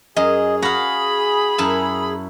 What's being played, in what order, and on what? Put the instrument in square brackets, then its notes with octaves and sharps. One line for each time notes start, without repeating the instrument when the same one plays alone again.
[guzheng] F#2 [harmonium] G#4 [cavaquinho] D#5
[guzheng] F#4 F5 [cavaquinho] A#5 [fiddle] B5
[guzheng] F#2 E4 A5